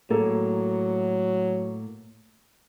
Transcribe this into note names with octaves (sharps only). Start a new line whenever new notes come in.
A2 F#3 A#3 A4